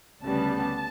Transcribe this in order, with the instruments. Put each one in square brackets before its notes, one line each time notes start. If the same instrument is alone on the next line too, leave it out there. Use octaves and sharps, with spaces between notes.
[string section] D2 C#3 G3 B3 A5